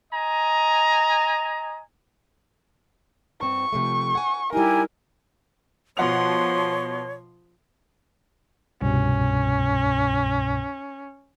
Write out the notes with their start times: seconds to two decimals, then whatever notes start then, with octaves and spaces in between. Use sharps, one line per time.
0.13 D#5 G#5 A#5
3.41 G2 C4 C#6
3.73 C3 F3 A3
4.15 F#5 G#5
4.53 G3 D#4 E4 G4 A#4 G#5
5.97 B2 F3 C#5 F#5 C6 F7
8.82 C2 G2 B2 C#4